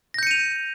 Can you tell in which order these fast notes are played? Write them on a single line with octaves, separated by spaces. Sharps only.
A#6 G6 C#7 D#7 F7